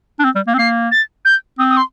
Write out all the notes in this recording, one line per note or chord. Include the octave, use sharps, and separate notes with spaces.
D4
C4
G3
A#3
C4
A#3 C7
A6
G6
C4 D#6
D#6
C6